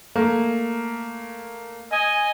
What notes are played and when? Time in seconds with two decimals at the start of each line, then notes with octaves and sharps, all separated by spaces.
0.16 A3 A#3
1.91 D#5 G#5